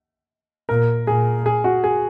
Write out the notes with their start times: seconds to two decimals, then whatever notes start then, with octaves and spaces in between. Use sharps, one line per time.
0.69 A#2 A#4
1.07 A#2 G#4
1.46 G#4
1.64 F#4
1.84 G#4